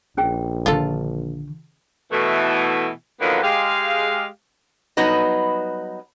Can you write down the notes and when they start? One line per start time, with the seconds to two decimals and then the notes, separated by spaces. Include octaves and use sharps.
0.17 A#1 C#4 G#4 G5
0.66 D3 D#3 F4 A4
2.11 B2 E3 A3
3.21 D3 D#3 F3 F#3 A#3 B3
3.43 G#3 G4 F5
4.97 F#3 G3 B3 D#4 B4 D#5